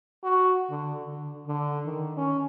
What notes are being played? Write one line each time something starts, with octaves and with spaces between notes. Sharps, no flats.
F#4
D3
D3
D3
D#3
C#4